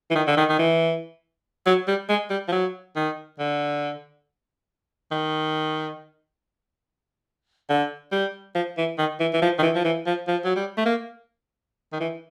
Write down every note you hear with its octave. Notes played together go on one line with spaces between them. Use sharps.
E3
D#3
D3
D#3
D#3
E3
F#3
G3
G#3
G3
F3
F#3
D#3
D3
D#3
D3
G3
F3
E3
D#3
E3
E3
F3
D#3
E3
F3
E3
F3
F3
F#3
G3
A3
A#3
D#3
E3